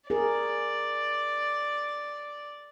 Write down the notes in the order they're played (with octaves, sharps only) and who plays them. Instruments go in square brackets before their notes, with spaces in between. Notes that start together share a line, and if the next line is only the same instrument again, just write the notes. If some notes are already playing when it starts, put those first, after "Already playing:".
[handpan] G#4 A#4 [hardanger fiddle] D5